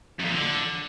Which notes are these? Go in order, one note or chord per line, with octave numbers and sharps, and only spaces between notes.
F#2
F2
A#2
D3